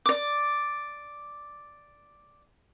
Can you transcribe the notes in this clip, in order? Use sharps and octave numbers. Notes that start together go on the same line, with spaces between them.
D5 D6